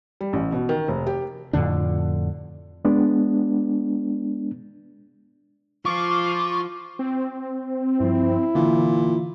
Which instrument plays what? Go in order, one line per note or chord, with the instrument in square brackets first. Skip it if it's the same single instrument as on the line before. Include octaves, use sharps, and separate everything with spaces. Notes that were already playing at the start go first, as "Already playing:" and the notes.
[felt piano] G3
A1
B2
D#3
F1
G4
[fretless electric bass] F2 A2 D3 D4
[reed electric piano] G#3 B3 D4
[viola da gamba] F3 [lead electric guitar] F4 [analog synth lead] C#6 [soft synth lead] D6
[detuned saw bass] C4
[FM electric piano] G2 F3 [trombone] E4
[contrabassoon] A#2 [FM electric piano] D3 E3